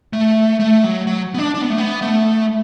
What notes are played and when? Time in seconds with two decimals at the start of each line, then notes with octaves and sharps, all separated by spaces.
0.13 A3
0.60 A3
0.84 F#3
1.07 F#3
1.34 B3
1.38 D4
1.54 D4
1.62 B3
1.70 A3
1.78 B3
2.02 A3